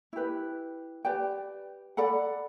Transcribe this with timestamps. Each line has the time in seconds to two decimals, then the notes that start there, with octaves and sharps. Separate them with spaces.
0.13 E4 G4 B4
1.05 G4 B4 D5 G5
1.97 A4 D5 F#5 B5